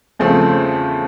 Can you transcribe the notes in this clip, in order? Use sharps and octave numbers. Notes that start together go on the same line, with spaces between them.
E2 C#3 F3 A3 C4